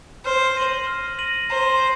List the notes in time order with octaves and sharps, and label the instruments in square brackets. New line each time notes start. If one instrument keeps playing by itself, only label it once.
[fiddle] C5 [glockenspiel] F6
[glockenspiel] A#6 D#7 F#7
F6
A#6 D#7 F#7
[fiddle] C5 [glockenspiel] A#5